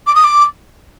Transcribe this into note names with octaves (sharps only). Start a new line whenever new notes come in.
D6
D#6
D6